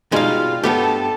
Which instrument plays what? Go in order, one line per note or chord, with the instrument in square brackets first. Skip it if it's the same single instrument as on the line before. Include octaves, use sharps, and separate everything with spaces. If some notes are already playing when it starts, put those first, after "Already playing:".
[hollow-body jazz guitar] B2 G3 D#4 [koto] G#3 F5 [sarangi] F4
[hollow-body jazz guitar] G2 B3 G4 [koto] A3 [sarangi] A4